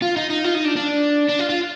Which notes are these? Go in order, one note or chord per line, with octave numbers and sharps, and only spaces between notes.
F4
D#4
D#4
F4
D#4
D4
D4
D4
F4
F4